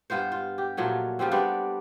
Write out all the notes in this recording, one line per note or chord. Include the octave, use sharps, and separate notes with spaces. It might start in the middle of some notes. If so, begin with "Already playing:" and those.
G2 B3 F4 C5
F4
G4
A#2 F3 F#3 A3
C#3 F3 G3 C4
G3 B3 C4 D4